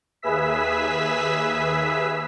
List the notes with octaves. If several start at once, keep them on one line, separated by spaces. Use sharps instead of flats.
D#2 G#4 B4 E5 E6 B6